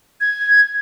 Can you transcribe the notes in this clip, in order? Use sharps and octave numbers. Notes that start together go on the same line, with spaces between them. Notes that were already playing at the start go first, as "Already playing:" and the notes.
G#6